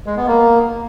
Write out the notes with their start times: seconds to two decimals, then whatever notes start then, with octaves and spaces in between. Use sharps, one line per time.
0.06 G#3
0.17 B3
0.27 A#3